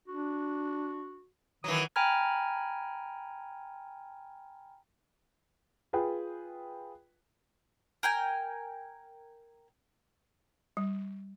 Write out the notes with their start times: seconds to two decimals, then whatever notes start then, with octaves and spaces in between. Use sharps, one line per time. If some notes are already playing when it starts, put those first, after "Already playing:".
0.08 D4 F#4
1.64 D#3 E3 F#3 D#6
1.96 G5 G#5 A#5 B5 F6 G#6
5.93 F4 G#4 B4 G5
8.03 A#4 G5 G#5
10.77 G3